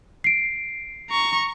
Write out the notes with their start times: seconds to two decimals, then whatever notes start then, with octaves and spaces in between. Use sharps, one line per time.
0.24 C7 D7
1.10 A#5 C#6